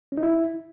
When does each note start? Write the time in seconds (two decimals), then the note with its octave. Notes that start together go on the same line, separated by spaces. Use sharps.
0.12 C#4
0.17 D#4
0.23 E4